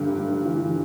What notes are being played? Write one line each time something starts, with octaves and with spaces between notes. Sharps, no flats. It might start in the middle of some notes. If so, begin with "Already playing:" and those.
Already playing: G1 G2
G1
E3